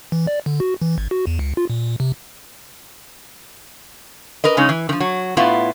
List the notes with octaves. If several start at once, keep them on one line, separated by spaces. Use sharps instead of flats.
E3
D5
D3
F#4
E3
G#1
F#4
E2
C#2
F4
A#2
C3
A#4 B4 D#5
C#3 G#3 C#4 D#4
E3
D#3 F3
F#3
A2 B3 E4 F4